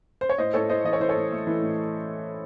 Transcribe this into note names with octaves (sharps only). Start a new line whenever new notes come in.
C5
C#5
A2 C5 D#5
A2 A4 C#5
A2 C5 D#5
E3 D#5
C#5
E3 C5
A4 C#5
A2
A3
E3
A2